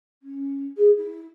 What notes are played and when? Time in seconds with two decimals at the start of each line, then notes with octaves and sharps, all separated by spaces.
0.23 C#4
0.77 G#4
0.98 E4